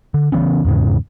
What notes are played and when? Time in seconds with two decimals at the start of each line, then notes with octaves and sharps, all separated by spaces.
0.14 D3
0.32 C#3 E3 B3 C#4
0.65 E2 G#2 C#3